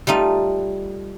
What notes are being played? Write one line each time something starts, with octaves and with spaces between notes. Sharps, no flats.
G3 A3 D#4 F4